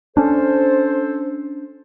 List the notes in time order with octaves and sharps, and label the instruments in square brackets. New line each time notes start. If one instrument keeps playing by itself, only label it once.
[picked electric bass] C#4 D4 [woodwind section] A4 C5